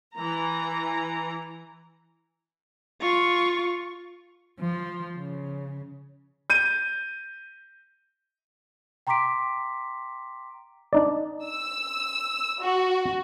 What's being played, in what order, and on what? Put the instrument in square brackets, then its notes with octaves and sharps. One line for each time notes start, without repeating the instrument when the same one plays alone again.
[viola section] E3 A#5
[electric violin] F4 C#6
[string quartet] F3
C#3
[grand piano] G6 D#7
[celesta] G5 A#5 C6 D6 B6 D7
[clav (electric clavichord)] D4 D#4 D5
[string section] E6
F#4